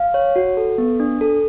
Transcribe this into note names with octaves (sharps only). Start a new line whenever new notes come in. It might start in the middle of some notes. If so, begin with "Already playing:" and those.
Already playing: F5
C#5
F#4
A4
B3
D4
A4